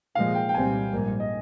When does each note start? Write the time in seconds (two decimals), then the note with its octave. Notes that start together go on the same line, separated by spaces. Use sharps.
0.15 C2 A#2 F3 G#3 F5
0.35 G5
0.49 G5
0.54 C2 A#2 G3 C4 G#5
0.93 A#1 G#2 G3 A#3
1.20 D#5